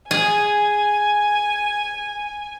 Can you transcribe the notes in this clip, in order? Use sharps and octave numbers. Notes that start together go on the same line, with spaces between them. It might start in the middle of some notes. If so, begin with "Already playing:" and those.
G#4 G#5